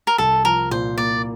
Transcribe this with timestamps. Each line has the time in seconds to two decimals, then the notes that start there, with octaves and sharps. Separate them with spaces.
0.07 A#4
0.18 C2 A4
0.45 F3 A#4
0.71 A#2 C5
0.97 A#3 D5